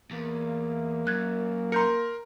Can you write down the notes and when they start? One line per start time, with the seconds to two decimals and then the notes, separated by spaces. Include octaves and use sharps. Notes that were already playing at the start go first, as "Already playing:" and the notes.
0.11 E2 A#3
1.07 F#2 F#6 G#6
1.72 A#4 A#5 C6 G6 C#7